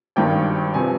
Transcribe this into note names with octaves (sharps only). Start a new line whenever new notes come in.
G#1 G2 D#3 G5
C3 F3 B3 G#5